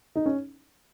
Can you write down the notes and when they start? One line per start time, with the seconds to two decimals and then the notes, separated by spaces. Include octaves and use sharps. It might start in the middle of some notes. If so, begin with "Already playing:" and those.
0.16 D#4
0.26 C#4